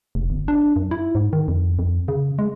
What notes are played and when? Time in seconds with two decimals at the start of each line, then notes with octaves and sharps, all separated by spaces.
0.15 F1
0.30 G1
0.48 D4
0.76 F#2
0.91 E4
1.15 G#2
1.33 D#3
1.48 F2
1.79 F2
2.08 C#3
2.39 G#3